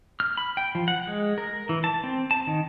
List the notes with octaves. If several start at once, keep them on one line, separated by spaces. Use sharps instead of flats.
F6
B5
G5
F3
F#5
G#3
A#4
E3
A5
C4
A5
D#3